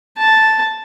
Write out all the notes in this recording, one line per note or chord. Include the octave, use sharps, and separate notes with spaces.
A5